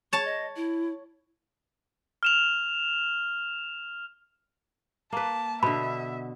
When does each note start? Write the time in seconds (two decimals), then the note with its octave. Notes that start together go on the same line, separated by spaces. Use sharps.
0.13 C#5 A5 C#6
0.25 D#5
0.56 E4
2.23 F6 E7 F7
5.13 A#3 B4 A5
5.63 B2 D3 E5 B5